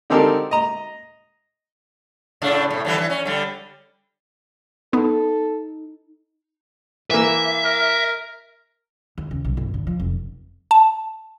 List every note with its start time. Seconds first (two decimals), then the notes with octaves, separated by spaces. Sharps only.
0.10 D3 C4 D#4 G4 A4 A#4
0.51 D#5 A#5
2.42 A2 C#3 D4
2.71 A2 C3
2.85 D3 E3 G3
2.98 E3
3.10 C#4
3.25 D3 G3
4.93 B3 D#4 A4
7.11 E3 A#3 E5
7.64 A#4
9.18 D#2
9.31 C#3
9.45 B1
9.57 G1
9.74 D3
9.87 F3
10.00 F1
10.71 A5